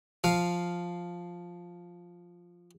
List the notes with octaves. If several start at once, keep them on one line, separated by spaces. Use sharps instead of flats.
F3 F5